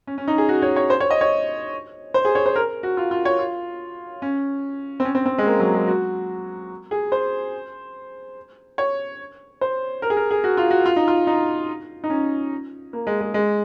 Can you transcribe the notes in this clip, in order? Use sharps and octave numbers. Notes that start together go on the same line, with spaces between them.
C#4
C#4
D#4
G#4
F#4
C#5
C#5
C5
C#5
D#5
C#5
C5
G#4
C#5
C5
A#4
F#4
F4
F4
C#5
F4
C#4
C4
C#4
C4
C4
G#3
A#3
F#3
G#3
F#4
G#4
C5
C#5
C5
A#4
G#4
A#4
G#4
F#4
F4
F#4
F4
D#4
F4
D#4
D#4
C#4
A#3
G#3
G#3
G#3